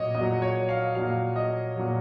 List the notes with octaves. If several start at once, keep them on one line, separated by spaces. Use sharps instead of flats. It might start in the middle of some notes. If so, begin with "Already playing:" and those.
Already playing: A#2 F#3 C#5 D#5
A#2 F#3 D#5
C#5
F5
A#2 F#3 F5
D#5
A#2 F#3